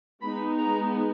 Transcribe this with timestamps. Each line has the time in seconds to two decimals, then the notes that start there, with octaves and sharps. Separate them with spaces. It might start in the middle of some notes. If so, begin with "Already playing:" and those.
0.21 G#3 B3 D#4 B5
0.58 A#5